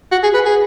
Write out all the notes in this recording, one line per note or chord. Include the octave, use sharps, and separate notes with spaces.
F#4
G#4
B4
G#4